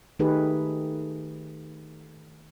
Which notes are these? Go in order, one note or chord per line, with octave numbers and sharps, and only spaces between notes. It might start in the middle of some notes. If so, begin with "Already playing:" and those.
D#3 A3 D#4 G4 G#4 B4